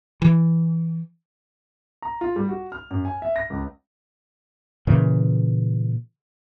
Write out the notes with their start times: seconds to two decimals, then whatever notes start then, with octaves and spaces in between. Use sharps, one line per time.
0.22 E3
2.02 A#5
2.21 F4
2.36 G3
2.49 F#4
2.72 F6
2.91 F#2
3.05 G#5
3.22 E5
3.36 A#6
3.50 C#2
4.87 A#2 C#3 E3